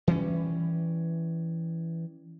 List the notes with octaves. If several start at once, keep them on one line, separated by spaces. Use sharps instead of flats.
E3 G3 C#4